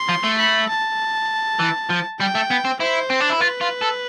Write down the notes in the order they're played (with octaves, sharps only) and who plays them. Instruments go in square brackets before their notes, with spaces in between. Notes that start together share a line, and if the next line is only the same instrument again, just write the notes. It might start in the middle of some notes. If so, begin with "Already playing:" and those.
Already playing: [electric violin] C6
[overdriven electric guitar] F3
A3
[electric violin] B5
A5
[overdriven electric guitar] E3
F3
[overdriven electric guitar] G3 [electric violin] G5
[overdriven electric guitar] A3
B3
C4
[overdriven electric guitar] E4 [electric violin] C5
[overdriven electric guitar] C4
D4
E4
[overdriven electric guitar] F4 [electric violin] B4
[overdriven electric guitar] F4
A4